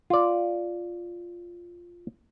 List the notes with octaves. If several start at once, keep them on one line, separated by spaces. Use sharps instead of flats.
F4 D5